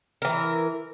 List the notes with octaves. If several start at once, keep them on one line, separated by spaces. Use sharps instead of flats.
E3 A#4